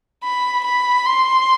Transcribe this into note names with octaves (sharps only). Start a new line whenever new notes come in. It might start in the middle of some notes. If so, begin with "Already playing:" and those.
B5
B5
C6